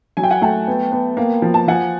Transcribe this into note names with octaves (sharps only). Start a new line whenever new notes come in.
F#3 G#5
G5
F#5 G#5
A3 G5 A5
B3
B3
A#3
F3
A5
F3 F#5 G#5